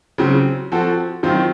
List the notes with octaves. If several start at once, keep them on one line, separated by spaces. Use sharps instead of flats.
C#3 F#3 C4
F3 C4 F#4 A4
D#3 F#3 C4 F4